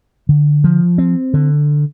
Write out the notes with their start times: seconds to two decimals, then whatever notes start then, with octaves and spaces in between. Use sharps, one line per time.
0.29 D3
0.64 F3
0.98 C4
1.34 D3